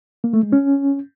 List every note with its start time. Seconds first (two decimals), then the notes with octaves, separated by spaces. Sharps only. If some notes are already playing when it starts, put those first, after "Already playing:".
0.24 A#3
0.33 A3
0.43 G#3
0.52 C#4